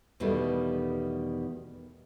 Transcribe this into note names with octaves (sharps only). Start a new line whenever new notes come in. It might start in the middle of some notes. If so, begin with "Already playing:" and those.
E2 B2 D#3 G3 A3